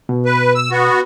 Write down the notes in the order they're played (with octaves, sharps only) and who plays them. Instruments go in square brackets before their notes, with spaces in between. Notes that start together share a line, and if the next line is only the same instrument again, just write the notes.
[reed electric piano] B2
[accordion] B4
E6
B3 F#4